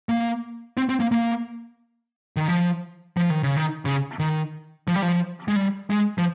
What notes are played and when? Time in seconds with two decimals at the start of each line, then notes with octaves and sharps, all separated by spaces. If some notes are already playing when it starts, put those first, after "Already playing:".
0.09 A#3
0.77 C4
0.89 C4
1.00 A#3
1.12 A#3
2.37 D#3
2.48 F3
3.17 F3
3.30 D#3
3.43 C#3
3.57 D#3
3.85 C#3
4.19 D#3
4.88 F3
4.96 G3
5.02 F3
5.48 G#3
5.56 G3
5.90 G#3
6.18 F3